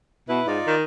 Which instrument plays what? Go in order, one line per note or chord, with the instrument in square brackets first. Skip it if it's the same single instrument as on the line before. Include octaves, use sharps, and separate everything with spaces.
[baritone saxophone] B2 [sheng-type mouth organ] E4 B4
[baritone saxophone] G#2 [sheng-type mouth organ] D#4 F4 D5
[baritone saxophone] D#3